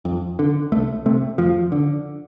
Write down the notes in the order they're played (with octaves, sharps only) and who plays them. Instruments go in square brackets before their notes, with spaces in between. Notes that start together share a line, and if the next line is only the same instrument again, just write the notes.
[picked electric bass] F2
D3
C2 A3
C3 A3
F2 F3
D3